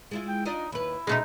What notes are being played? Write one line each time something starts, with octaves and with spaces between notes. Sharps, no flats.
G#3 E4 F4
G5
D4 D#4 F4 D#5
D#2 E4 B4
B2 G#3 A3 D#4 G#4